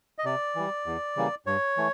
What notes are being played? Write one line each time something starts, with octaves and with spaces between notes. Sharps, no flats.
D#5
C3 D5
E3 G3
E2
C#3 E3 G3 A#3
G2 C#5
E3 A3